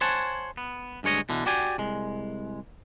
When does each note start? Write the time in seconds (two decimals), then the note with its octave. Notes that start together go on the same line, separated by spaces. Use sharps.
0.01 C5 C#5 F#5 G#5 A5
0.57 B3
1.03 D2 G2 G#3 C#5 D#5
1.29 B2 D3 E3
1.46 F#4 G4 D5 G5 G#5
1.78 C2 G#3